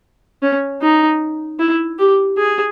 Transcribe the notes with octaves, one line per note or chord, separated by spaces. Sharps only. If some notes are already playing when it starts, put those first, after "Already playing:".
C#4
D#4
E4
G4
G#4